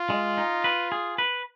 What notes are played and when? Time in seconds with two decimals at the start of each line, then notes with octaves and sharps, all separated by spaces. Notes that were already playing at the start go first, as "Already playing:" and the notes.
Already playing: F4
0.10 G#3
0.38 D#4
0.64 B4
0.92 G#4
1.18 B4